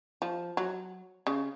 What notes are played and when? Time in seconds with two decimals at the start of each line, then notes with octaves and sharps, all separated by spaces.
0.22 F3
0.57 F#3
1.27 C#3